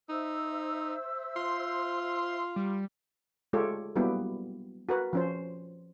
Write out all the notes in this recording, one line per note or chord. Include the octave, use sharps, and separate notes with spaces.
D#4 C5 E5 E6
F4 C6
G3
G#3 A3 F4 G4 A4 C#5
F#3 G3 A#3 B3 E4 G4
F#4 A#4 B4
F3 C#4 C5